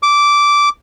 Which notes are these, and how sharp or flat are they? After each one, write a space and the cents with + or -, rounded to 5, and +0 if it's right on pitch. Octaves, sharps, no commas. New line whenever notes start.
D6 -10